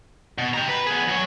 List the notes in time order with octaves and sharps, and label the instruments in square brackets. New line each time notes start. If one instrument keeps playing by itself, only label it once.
[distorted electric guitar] B2
G4 A#5
B4
B3 G#4
F#3 C#5